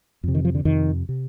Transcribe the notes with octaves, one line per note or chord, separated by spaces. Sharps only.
F2 C3
D#3
F3
D3
F2 C3 D#3
C3